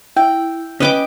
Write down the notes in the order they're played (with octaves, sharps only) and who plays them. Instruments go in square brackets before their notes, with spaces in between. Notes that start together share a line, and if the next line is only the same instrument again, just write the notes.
[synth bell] E4 [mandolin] G5
[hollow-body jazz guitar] C#4 B4 [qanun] D#5 G5 D6